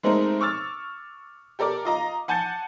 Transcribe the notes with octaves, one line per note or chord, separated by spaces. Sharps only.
G#3 A3 C4 D#4 A#4
C#6 D6 E6 F6 A6
G4 A4 A#4 D5 D6
F4 D#5 A#5
F#5 G#5 A5 G6 A6 C#7